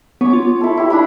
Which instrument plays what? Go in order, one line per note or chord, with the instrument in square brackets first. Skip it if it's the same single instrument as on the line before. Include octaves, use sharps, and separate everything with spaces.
[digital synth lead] B3 [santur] C#5 D6
[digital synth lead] F4
[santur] E4 A4
E4 G4
D4 E4 B5